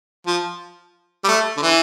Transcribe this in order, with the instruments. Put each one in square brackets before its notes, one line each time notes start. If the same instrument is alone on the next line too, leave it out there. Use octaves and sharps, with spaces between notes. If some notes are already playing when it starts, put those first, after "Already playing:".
[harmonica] F3
G3
A3
D3
E3